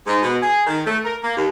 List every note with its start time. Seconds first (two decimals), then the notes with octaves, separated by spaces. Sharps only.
0.07 G#2
0.22 B2
0.42 G#4
0.67 D#3
0.86 A3
1.04 A#4
1.23 A#3
1.37 D#2